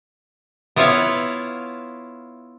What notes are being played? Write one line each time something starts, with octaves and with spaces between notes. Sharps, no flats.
B3 E4 F4 C#5 E5 F5